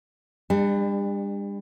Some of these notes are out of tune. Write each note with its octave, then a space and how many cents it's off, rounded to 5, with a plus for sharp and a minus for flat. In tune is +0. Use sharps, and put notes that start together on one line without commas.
G3 +40 D4 +20